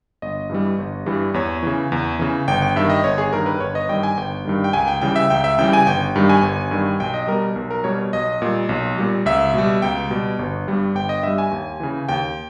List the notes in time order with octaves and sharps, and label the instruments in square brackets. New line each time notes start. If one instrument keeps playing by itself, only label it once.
[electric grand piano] G1 D#5
G2 E3 G3
G1
G2 E3 G3
E2 C#5
C#3 E3
E2
C#3 E3
G1 G5
G5
G2 D#3 E5
D#5
G1 C#5
G#4
G2 D#3 A#4
B4
G1 C#5
D#5
G2 D#3 G3 G5
G#5
G1 G5
G2 D#3 G3
G5
C#2 G#5
G5
C#3 E3 G3 G5
E5
C#2 G5
E5
C#3 E3 G3 G5
G#5
G1 G5
G2 D#3 G3
G#5
G1
G2 D#3 G3
B1 G5
D#5
B2 G3 A#4
B1
A#4
B2 G3 C#5
B1 D#5
A#2 G3
B1
A#2 G3
C#2 E5
B2 G3
C#2 G5
B2 G3
G1
G2 G3
G1 G5
D#5
G2 G3 E5
G#5
D#2
C#3 E3
D#2 G5